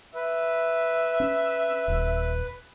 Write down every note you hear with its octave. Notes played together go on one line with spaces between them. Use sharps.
B4 E5
C#4
D#1